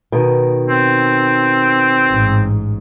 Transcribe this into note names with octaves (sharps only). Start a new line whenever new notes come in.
B2 D#3
C4
A1 G#2